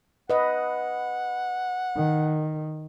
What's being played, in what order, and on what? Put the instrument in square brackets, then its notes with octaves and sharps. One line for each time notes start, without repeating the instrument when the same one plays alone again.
[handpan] B4 D#5 [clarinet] F#5
[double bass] D#3